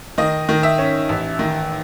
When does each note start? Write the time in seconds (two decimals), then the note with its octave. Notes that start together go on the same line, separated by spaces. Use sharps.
0.18 D#3 D#5
0.49 D#3
0.63 E5
0.78 C#4
1.09 A1
1.39 D#3